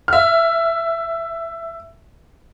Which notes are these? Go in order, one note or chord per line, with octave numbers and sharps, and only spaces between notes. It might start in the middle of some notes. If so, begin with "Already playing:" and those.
E5 F6